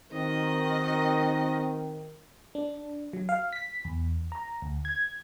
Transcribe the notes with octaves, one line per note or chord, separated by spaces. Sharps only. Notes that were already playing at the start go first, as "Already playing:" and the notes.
D#3 C4 F#4 D#5
D4
F#3
F5
B6
E2
A#5
D2
G#6